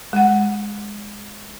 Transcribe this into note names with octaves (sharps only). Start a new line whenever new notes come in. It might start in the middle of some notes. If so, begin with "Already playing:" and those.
G#3 F#5